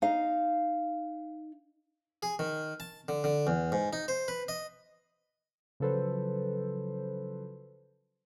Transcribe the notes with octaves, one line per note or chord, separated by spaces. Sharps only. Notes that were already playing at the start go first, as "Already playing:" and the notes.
D#4 F5
G#4
D#3
A5
D3
D3
E2
G#2
D#4
C5
B4
D#5
C#3 F3 F#3 A4 B4 C5